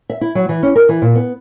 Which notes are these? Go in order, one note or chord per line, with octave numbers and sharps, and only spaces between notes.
E5
E4
F#3
E3
C#4
A#4
E3
A#2
B3